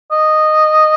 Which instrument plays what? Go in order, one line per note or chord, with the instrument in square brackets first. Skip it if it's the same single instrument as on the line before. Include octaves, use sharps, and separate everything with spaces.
[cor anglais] D#5